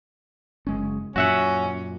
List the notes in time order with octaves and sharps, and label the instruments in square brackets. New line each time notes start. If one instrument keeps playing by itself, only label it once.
[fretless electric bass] F#1 G#3 C#4
[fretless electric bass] F#2 A#2 [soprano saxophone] C#4 [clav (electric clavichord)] F#4 E5 F#5